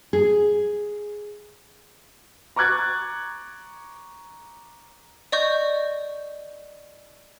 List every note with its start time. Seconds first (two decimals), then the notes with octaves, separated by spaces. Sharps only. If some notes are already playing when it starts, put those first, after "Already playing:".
0.13 G#4
2.56 A#5 C#6 D6 F#6 G#6 A6
5.32 D5 D#5 C#6 G6